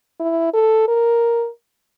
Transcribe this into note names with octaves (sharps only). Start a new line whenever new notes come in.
E4
A4
A#4